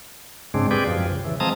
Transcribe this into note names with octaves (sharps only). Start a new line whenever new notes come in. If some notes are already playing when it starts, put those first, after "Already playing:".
G#2 C#3 G#3 C4 D4
C4 G4 G#4 B4 D5
F#2 F3
C#3
C#3 E3
F3 G#3 C4 A5 A#5 D#6